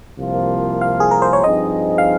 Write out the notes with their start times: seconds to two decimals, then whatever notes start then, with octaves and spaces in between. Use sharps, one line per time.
0.19 C2 C3 F3 A#3 F4
0.81 F5
1.00 G#4
1.11 A#4
1.22 C5
1.33 C#5
1.44 G2 F3 C4 D#4 G#4 D#5
1.98 F5